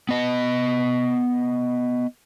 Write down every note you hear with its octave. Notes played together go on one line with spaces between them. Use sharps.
B3 D#5